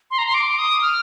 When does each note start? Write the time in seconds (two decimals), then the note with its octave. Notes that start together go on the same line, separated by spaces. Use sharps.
0.11 C6
0.18 A#5
0.26 C6
0.34 D6
0.59 D#6
0.82 F6